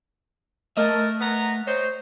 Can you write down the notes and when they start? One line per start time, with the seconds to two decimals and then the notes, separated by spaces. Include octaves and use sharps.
0.77 A3 A#4 D#5 E5 A5
1.21 B3 A#5
1.66 C5 C#5 D#5